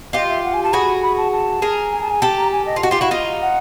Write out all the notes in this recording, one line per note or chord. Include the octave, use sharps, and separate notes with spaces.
F4 G4 D#5
E5
F#5
G#5
A5
F#4 G#4 B5
B5
A5
A5
G#4 A#4
G#5
A5
G#5
G4 A4 A5
A#5
G#5
D#5
F4
F#4 D#5
F4 G4
E4 F#4 F5
D#4 F4
F#5